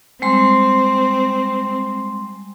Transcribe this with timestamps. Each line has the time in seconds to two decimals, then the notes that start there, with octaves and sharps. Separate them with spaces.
0.22 G3 G#3 C4 C6